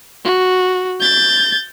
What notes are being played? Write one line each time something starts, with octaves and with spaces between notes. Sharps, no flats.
F#4
G6 A6